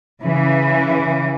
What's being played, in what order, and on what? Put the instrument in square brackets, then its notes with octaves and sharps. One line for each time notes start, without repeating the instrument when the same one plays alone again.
[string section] C#3 E3